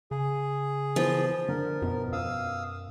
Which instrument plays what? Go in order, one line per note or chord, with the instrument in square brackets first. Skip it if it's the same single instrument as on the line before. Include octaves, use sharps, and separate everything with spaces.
[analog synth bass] C#3 [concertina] G#4
[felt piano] E3 B3 [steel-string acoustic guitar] F3
[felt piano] D3 [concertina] A#4
[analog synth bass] F#2 [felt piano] B2
[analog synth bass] F#2 [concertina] F5 D#6 E6